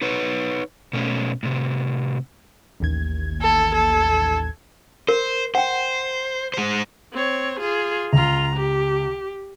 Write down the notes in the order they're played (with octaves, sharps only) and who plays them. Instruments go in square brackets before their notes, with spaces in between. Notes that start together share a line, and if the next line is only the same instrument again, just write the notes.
[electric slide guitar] D#4 B4 C#5
B2 A3 C#4
A2 C3
[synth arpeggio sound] A1 D#2 G#6
[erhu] A4
A4
[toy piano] A#4 [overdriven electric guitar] C5
[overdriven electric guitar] C5 [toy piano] F#5 G5
[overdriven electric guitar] G#3 C5
[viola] C4 C#5
F4 G#4
[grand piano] C#2 [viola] F4 A#5
[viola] G4